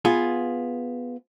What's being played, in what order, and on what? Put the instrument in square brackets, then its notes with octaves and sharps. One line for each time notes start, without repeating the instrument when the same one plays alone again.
[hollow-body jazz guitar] B3 F4 G#4